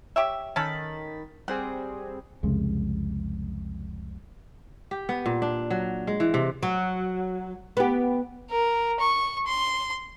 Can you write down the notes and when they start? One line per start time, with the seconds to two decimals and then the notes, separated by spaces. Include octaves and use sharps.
0.16 G4 C#5 E5
0.56 D#3 C#4 A4 B5 A6
1.48 G3 C4 G#4 F#5
2.43 C2 F2 C#3 G#3
4.91 G4
5.09 B3
5.26 A#2
5.42 D4
5.71 F#3
6.07 G#3
6.20 E3
6.34 C3
6.63 F#3
7.77 B3 G4
8.50 A#4
9.00 C#6
9.47 C6